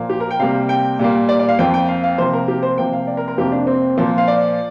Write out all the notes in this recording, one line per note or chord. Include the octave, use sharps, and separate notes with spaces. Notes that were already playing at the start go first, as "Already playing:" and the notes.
Already playing: A#2 F3 A#3
G4
A#4
G5
C3 G3 A#3 F5
G5
A#2 G3 A#3
D5
D5
F5
F2 F3 A#3 G5
G5
F5
F5
C3 F3 A#3 C5
A#4
G4
C5
C3 F3 A#3 G5
F5
D5
A#4
A#4
F2 C3 F3 A#3 G4
D4
C4
A#2 F3 A#3
F5
D5